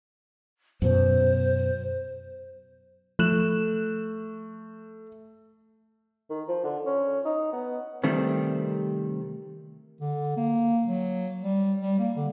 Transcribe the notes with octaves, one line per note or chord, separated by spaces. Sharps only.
F#2 B2 C5
F3 A3 F#6 E7
D#3
F3
D3
C#4
D#4
B3
C3 D#3 G3 A3 C4
D3
A#3
F#3
G3
G3
A#3
D3